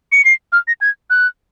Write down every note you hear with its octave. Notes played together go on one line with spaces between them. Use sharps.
C#7
C7
F6
A#6
G#6
F#6